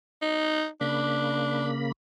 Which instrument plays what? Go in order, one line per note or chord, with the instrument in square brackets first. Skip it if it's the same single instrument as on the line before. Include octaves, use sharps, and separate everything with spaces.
[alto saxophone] D#4
[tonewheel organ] C#3 A#3 B5 [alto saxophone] D4